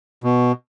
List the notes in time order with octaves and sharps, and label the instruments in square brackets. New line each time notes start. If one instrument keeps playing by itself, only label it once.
[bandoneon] B2